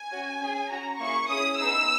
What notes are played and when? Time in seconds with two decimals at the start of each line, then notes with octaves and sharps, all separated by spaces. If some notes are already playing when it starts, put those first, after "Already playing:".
Already playing: G#5
0.12 C#4 F#4
0.41 C#4 G#4
0.71 C#4 F#4 A#5
0.99 A#3 E4 G#4 C#6
1.29 C#4 E4 G#4 D#6
1.58 B3 D#4 G#4 E6